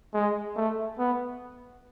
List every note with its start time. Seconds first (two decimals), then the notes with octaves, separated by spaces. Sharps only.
0.14 G#3
0.56 A3
0.99 B3